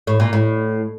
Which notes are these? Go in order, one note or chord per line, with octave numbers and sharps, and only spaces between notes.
A2
A#2
A2